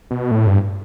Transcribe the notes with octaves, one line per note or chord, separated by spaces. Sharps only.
B2
A2
G2